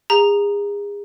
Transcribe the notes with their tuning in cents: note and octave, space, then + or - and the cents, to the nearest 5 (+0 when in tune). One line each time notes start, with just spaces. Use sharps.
G#4 -35 A#5 +0